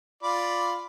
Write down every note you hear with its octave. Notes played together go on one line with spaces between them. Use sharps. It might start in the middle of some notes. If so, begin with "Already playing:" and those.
F4 D5 B5